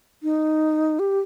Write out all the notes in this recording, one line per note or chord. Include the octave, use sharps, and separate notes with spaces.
D#4
G4